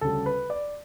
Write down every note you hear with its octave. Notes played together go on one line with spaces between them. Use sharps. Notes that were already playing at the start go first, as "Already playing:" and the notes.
D2 C#3 G3 A4
B4
D5